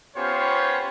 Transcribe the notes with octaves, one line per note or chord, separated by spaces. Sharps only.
B3 C#4 F4 G4 C5 C#5